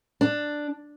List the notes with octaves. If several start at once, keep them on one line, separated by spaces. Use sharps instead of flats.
D4